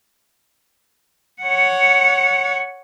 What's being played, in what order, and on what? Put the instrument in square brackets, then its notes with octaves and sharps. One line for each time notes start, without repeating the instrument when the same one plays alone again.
[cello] C#5 F#5